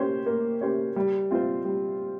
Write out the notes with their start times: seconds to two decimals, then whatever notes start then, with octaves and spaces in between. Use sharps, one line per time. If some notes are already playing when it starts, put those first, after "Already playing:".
Already playing: A#3 C#4 G4 C5
0.26 A#3
0.61 C#4 G4 C5
0.96 G3
1.31 C4 F4 C5
1.65 G3